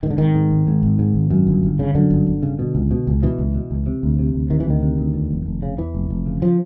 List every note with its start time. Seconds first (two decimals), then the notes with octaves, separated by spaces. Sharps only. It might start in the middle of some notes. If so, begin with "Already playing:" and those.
0.03 G#2 D#3
0.10 D3
0.18 G#1 D#3
0.35 G#2
0.51 G#1
0.67 G#2
0.83 G#1
0.99 G#2
1.15 G#1
1.30 F#2
1.47 G1
1.63 G1
1.79 C#3
1.95 F#2 D3
2.10 G1
2.27 G1
2.43 C#3
2.59 B2
2.75 C#2
2.91 B2
3.07 C#2
3.22 B2 E3
3.38 C#2
3.55 B2
3.71 C#2
3.86 C3
4.03 D2
4.19 C3
4.34 D2
4.50 C3 D#3
4.60 E3
4.66 D2 D#3
4.82 C3
4.98 D2
5.14 E2
5.31 F1
5.46 F1
5.62 C#3
5.78 E2 E3
5.94 F1
6.10 F1
6.26 C#3
6.42 F3